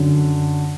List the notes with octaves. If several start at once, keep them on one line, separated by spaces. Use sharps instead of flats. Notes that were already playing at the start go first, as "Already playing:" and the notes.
Already playing: F#2 D3